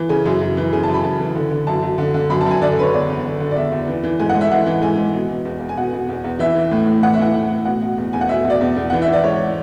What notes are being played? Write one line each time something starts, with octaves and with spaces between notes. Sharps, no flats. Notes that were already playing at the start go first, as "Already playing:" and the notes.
Already playing: E3
C#3 G#5
F#2
F#2
E3
C#3 G#5
A5
F#2
B5
F#2 A5
E3
D3
D3
F#2 A5
F#2
D3
D3
F#2 B5
A5
F#2 G#5
D3 D5
A4
D3 B4
C#5
E2 D5
E2
D3
D3
D5
E2 E5
E2
E3
E3
G#2 G#5
F#5
G#2
E5
E3 F#5
E3
G#2 G#5
G#2
B2
B2
E2
E2
G#5
B2 F#5
B2
E2
E2
E3 E5
E3
A2
A2
E3 F#5
E5
E3 F#5
A2
A2
B2 F#5
B2
E2
E2 G#5
F#5
B2 E5
B2
D5
E2
E2
E3 F#5
E5
E3
D5
G#2 C#5